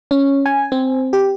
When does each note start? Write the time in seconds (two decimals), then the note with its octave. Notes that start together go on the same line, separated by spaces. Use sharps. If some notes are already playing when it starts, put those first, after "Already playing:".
0.11 C#4
0.46 G#5
0.72 C4
1.13 G4